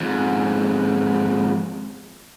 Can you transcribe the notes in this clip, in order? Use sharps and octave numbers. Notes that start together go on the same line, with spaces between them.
F2 G#2